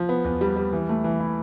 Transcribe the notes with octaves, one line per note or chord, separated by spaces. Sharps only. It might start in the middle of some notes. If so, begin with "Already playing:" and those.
Already playing: F3
B3
E2
G3
G3
E3
A3
E3
E4